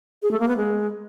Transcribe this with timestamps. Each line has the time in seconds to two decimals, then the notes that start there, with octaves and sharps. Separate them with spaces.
0.23 G#4
0.31 A3
0.40 A#3
0.48 B3
0.57 G#3